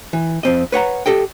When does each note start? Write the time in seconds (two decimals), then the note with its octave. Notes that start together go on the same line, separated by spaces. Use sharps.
0.13 E3
0.43 F2 C4 D#5
0.72 B4 C#5 F#5 A#5
1.06 G4 A4 D#5 G5